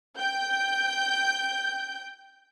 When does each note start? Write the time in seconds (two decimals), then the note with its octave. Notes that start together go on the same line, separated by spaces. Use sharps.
0.18 G5 G6